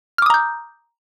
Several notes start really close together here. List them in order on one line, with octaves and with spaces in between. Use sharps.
F6 D6 D#6 A#5 G6